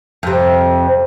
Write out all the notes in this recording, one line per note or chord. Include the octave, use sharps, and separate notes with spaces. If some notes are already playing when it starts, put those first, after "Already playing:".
F2 C3